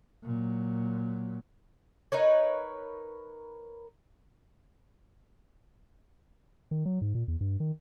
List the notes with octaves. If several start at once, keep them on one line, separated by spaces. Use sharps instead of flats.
A#2 F#3
D#4 A#4 B4 C#5
D#3
F#3
G#2
A#2
E2
G2
D#3